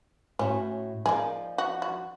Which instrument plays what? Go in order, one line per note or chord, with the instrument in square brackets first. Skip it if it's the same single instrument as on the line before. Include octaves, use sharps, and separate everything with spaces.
[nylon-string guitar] A2 F#4 [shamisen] C#4
[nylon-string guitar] F3 D#4 D5 [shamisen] A#3 G#4
[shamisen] F#4
F#4